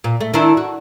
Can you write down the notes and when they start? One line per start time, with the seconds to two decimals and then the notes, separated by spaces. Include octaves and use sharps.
0.04 A#2
0.21 A3
0.34 D#3 D4 E4
0.57 F#4